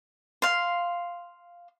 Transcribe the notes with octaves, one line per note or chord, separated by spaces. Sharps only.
F5 C6